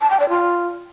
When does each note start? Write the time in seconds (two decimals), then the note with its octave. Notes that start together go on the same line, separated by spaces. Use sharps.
0.01 A5
0.10 G5
0.20 D5
0.29 F4